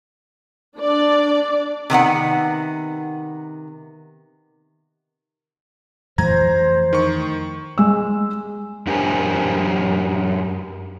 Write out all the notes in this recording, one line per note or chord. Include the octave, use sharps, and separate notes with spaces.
D4 D5
C3 D#3 B3 F#5
F2 E3 A3 C5 A#5 G#6
D#3 C#6
G#3 E6
F#2 D4 G4 A#4 C5 G#5